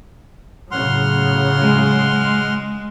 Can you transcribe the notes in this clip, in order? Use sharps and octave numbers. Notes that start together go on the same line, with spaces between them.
A2 C#3 F#3 F#5 C6 F6
G#3